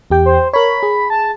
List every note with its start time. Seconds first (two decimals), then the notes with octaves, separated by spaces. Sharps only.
0.10 E2 G4 G5
0.26 C5
0.53 A#4 C#5 B5
0.83 G#4
1.10 A5